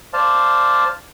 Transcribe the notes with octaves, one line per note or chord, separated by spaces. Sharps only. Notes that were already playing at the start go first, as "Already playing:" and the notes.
C5 D5 F5 A5